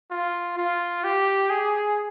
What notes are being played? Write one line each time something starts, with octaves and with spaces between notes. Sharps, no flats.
F4
F4
G4
G#4